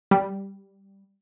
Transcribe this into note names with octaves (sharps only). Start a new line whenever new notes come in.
G3